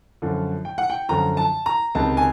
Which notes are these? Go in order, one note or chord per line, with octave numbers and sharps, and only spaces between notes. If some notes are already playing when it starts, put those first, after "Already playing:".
F#2 D3 F3
G5
F#5
G5
F#2 D3 F3 A#5
A5
A#5
C#2 C3 D#3 A5
G#5